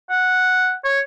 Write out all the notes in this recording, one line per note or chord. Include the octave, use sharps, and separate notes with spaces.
F#5
C#5